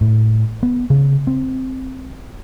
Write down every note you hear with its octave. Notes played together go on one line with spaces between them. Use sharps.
A2
B3
C#3
C4